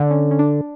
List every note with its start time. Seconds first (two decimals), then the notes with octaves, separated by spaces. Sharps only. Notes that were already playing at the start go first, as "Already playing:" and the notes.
Already playing: D3 D4
0.11 C#4
0.31 C#4
0.39 D4